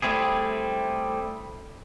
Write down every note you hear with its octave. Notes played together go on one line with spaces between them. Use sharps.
G3 A3 C4 E4 G#4